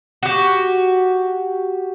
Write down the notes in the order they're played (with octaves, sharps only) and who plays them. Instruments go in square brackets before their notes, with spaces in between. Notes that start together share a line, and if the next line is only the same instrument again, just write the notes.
[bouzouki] F#4 G4